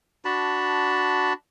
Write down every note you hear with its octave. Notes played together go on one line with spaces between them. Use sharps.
D4 F#4 A5 B5